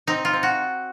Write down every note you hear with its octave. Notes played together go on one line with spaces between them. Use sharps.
C4 D#4
F4
C4
F#4